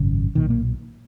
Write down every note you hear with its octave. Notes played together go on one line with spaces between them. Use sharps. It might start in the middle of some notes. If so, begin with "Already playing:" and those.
Already playing: G#1 F#2 C#3
B1 A#2 D#3
A#3